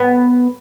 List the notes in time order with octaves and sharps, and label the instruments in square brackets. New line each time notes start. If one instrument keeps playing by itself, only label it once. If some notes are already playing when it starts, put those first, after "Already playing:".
Already playing: [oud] B3